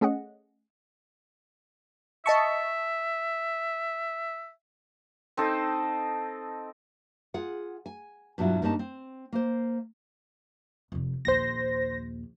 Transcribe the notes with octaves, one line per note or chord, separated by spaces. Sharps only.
A3 C#4 G#4 D#5 F#5
D#5 E5 A5 C#6
C4 D#4 A4
F4 G#4 F#5
G#5
G2 B2 F#3 D4 E4 F4
G2 G3 A#3 C#4 D#4 A5
C4
A#3 C5
F1 F2
A#1 D#2 C5 A#6